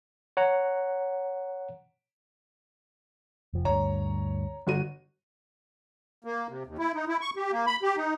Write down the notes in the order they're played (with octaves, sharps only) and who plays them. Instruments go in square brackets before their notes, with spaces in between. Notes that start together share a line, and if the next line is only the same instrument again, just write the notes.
[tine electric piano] C#5 F#5 A#5
[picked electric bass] F1 F3
[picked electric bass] D2 G2 [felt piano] C#5 A#5
[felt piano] G1 F#4 D#7
[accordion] A#3
C3
D#2
E4
D#4
E4
C#6
G4
A#3
B5
G4
D#4